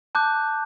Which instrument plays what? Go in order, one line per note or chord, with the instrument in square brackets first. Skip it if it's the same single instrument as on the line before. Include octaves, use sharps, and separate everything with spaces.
[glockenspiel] A5 D6 F#6 G6